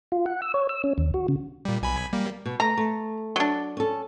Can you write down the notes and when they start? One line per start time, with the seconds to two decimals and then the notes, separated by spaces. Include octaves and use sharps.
0.12 F4
0.26 F#5
0.42 E6
0.54 C#5
0.69 E6
0.84 C#4
0.98 D#2
1.14 F#4
1.28 C#3
1.65 A#2 G3
1.82 B1 G#5 B5
2.13 G3 A#3
2.46 B2
2.60 A3 A#5
2.77 A3
3.36 F#3 D4
3.77 C#4 A4